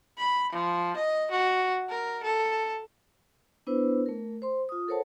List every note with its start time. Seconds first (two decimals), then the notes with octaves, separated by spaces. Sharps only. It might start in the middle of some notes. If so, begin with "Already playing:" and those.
0.18 B5
0.52 F3
0.96 D#5
1.31 F#4
1.89 A#4
2.23 A4
3.67 B3 D4 E4 B4 C5 E6
4.06 A3 A#4
4.42 C5 C6
4.69 F4 D#6
4.88 A4 A#4 C5 C#5 F#5 A5